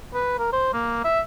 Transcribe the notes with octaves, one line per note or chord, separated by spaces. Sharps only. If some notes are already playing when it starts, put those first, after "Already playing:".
B4
A#4
C5
A#3
E5